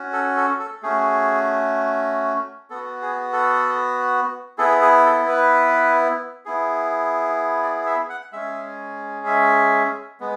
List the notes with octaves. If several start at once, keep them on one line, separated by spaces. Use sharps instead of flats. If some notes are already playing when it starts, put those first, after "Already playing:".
Already playing: C#4 F#4
A4
A4
A4
A3 C#4 F#4 G#4
B3 F#4 A4
G#4
A4
B3 E4 G#4 A4
G#4
A4
B4
B3 E4 G#4
D5
E5
F#5
G#3 C#4 G#4 E5
E5
G#3 B3